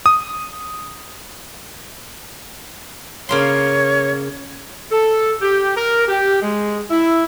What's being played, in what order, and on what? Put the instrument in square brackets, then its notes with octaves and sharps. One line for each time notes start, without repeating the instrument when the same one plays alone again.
[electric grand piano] D#6
[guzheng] C#3 A#3 C6 [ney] C#5
[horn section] A4
G4
A#4
G4
G#3
E4